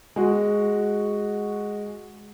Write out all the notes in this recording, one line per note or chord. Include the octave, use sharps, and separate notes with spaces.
G#3 F#4